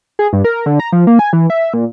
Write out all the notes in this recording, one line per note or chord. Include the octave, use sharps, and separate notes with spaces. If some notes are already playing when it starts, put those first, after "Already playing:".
G#4
G2
A#4
D3
A#5
F3
A#3
G#5
E3
E5
A#2